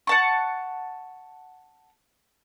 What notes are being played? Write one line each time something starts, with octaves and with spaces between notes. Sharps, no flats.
F#5 A5 C#6